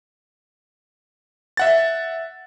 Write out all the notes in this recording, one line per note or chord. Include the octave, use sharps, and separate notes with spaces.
E5 F#5 A6